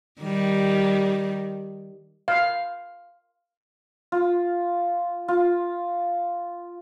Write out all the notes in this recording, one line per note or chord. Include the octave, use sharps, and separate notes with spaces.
D#3 G3
F5
F4
F4